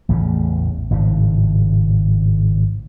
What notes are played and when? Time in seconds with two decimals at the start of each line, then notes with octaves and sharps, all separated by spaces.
0.09 A1 E2 A2 C#3
0.91 G#1 A2 C#3